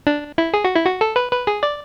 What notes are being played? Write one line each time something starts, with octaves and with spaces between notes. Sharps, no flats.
D4
E4
G#4
F#4
E4
F#4
A4
B4
B4
G#4
D5